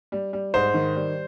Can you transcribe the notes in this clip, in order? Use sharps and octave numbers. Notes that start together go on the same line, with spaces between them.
G3
G3
G#2 C5
D#3
G3